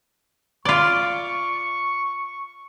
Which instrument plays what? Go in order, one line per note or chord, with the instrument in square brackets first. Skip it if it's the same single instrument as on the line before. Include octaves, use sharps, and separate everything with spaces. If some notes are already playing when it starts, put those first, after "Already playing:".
[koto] F4 D5 [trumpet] C#6